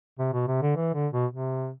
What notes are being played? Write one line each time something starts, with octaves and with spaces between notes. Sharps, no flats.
C3
B2
C3
D3
E3
D3
B2
C3